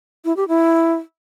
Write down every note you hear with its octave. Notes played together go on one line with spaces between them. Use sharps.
E4
G4
E4